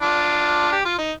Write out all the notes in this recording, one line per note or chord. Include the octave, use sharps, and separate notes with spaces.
D4 F4
G4
F4
D#4